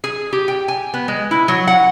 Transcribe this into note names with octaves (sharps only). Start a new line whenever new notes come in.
G#4
G4
G5
G#5
B3
G#3
E4
F#3
F#5